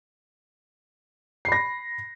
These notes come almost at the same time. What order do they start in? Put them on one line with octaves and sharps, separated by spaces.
C7 B5 A#6